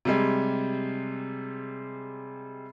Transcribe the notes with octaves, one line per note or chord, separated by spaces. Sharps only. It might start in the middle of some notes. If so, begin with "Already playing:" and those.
C3 G3 G#3